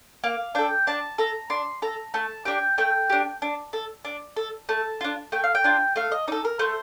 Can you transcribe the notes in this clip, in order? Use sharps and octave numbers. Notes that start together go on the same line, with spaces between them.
A#3 F5
D4 A4 G5
D4 A5
A4 A#5
D4 C6
A4 A#5
A3 A5
D4 G4 G5
A3 G5
D4 G4
D4
A4
D4
A4
A3 A5
D4 F4
A3 G5
F5
G5
D4 F4
A3 F5
D#5
D#4 A4 D5
A#4
A3 C5